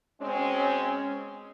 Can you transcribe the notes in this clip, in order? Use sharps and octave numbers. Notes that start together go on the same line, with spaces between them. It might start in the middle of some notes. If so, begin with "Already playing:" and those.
B2 G#3 C4 C#4